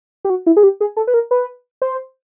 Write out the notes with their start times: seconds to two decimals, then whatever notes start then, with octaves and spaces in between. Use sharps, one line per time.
0.25 G4
0.30 F#4
0.46 E4
0.57 G#4
0.63 G4
0.81 G#4
0.97 A4
1.07 B4
1.14 A#4
1.31 B4
1.82 C5